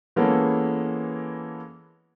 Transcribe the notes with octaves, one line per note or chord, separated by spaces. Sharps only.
E3 G#3 A#3 B3 C#4 A4